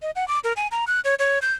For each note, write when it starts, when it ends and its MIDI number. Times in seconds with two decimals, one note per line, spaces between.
0.02 0.11 75
0.16 0.27 78
0.28 0.39 86
0.44 0.53 70
0.56 0.67 80
0.71 0.85 82
0.87 1.00 90
1.04 1.15 73
1.19 1.39 73
1.42 1.53 91